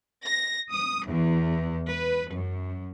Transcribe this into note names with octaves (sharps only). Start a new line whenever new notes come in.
A#6
D#6
E2
B4
F#2